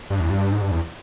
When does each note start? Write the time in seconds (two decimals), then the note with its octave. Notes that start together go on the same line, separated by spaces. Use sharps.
0.10 G2
0.20 E2
0.30 G2
0.52 G#2
0.62 G2
0.71 E2